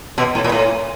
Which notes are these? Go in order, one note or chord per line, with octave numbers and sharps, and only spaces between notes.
B2
A2
A#2
A2